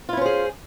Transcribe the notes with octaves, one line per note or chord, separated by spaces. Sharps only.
C#4 E4 F4 G#4 C5